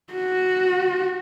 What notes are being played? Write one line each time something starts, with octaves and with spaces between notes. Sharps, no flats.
F#4